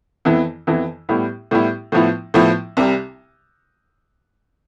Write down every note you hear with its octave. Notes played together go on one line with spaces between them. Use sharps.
F2 E3 B3 E4
F2 E3 B3 E4
A2 G3 B3 E4
A2 G3 B3 E4
A2 F3 B3 E4
A2 F3 B3 E4
C2 C3 G3